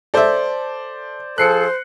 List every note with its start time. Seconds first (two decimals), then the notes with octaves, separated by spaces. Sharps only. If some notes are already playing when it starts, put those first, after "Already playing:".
0.14 A4 C5 D5 E5
1.38 F3 G#4 A4 C5 F#6 C7 C#7